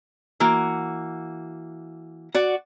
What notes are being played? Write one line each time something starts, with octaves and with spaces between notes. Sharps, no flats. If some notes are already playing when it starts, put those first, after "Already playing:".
E3 A#3 F#4
F#4 D5